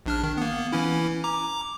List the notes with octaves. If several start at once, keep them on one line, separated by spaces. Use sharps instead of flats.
A#1 D4 F6
D#3
A#3 B3
E3 C#4 E4
A#5 D6